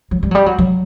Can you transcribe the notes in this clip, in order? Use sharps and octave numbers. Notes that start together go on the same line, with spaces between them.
F#3
G3
F#3
G3
F#3
F#3